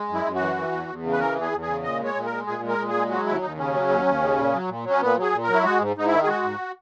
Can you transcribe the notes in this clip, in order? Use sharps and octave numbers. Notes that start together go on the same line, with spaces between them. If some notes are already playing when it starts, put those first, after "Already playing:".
Already playing: G#3
F#2
E4
F#2
F#4
E3
E3
E2
E2
C#3
B4
E3 A#4
E2
G#4
E2
C#3 G#4
A#2 D#5
G#3
C#5
A#2
A#4
G#3
A#2 G#4
G#3
A#4
A#2
G#4
G#3
F#3 F#4
D#2 E4
D#2 D#4
C#3 C#4
F#3
D#2
D#2
C#3
A#2
F#3
A#2
F#3
C#4
A#2 B3
F#3 G#4
A#2
A#4
F#3
E4
G#3 F#4
G#2
G#2 D#4
E4
D#3
G#4
G#3 F#4
G#2